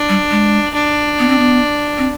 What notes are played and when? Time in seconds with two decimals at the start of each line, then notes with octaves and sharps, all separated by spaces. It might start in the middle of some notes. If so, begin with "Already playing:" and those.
Already playing: D4
0.09 G3
0.31 G#3
0.74 D4
1.19 B3
1.28 C4
1.38 B3
1.98 C4